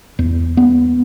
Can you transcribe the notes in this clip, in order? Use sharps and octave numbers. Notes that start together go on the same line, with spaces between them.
E2
B3